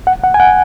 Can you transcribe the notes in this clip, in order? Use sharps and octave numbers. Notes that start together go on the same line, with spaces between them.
F#5
F#5
G#5
F#5